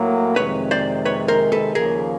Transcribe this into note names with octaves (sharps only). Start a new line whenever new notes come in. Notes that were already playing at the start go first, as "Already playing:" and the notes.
Already playing: A2 F#3 A#3
F2 C3 D#3 G#3 B4 C#5
C5 D5
B4 C#5
A#4 C5
A4 B4
D#2 C#3 F3 A#3 G#4 A#4